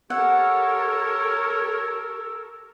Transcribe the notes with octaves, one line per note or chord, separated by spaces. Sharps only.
G4 A4 A#4 C#5 F#5 E6